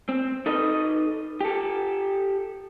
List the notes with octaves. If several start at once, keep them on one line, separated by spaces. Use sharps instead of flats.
C4
D#4 A4 B4 D#5
G4 A4